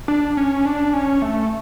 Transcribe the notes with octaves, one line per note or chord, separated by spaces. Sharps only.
D4
C#4
D4
C#4
A3